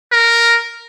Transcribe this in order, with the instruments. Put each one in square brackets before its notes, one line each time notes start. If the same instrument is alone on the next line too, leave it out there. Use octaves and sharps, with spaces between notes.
[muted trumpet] A#4